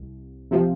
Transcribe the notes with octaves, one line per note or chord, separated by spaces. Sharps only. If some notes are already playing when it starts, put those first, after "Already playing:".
Already playing: C2
C3 F3